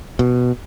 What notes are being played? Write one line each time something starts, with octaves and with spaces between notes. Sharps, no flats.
B2